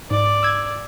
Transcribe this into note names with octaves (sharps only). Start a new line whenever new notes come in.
G#2 D5
E6 G#6